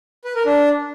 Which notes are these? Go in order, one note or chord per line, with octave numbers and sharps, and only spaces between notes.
B4
A#4
D4